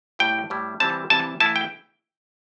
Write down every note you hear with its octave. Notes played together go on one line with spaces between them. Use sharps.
A2 G3 E4 G5
A2 G3 E4
C3 E3 G3 C4 E4 A5
C3 E3 G3 C4 E4 A5
E3 A3 E4 A5
G5